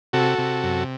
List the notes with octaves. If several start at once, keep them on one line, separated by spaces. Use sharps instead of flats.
C3 F#4 A4
C3
F#2